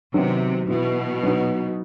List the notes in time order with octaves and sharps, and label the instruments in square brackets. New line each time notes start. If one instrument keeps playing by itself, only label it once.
[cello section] C3 [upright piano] D#3 F#3 B3 D#4
[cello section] B2 [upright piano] E3 B3 E4
[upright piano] F#3 B3 D#4